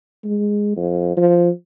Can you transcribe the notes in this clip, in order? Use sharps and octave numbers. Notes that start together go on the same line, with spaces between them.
G#3
F2
F3